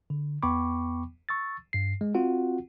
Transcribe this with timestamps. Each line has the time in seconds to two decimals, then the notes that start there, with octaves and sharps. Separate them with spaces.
0.10 D3
0.43 E2 B3 G5 B5 C#6 D6
1.29 C#6 E6 A6
1.73 G2 C7
2.01 G#3
2.15 C4 F4 F#4 F#5